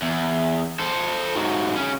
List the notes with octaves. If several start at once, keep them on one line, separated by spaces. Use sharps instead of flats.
E2
A4 C5
G#2 F#3
C#3 C#4